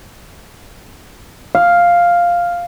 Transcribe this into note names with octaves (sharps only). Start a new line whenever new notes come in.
F5